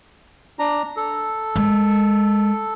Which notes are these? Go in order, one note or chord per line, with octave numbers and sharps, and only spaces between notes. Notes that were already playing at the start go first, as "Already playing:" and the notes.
D4 A#5
A4
G#3